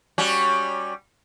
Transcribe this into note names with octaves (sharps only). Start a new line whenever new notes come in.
G3 C#4 F#4